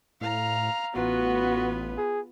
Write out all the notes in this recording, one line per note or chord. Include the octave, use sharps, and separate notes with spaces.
A2 F5 A#5
A1 B3 F4 F#4 B4
G#4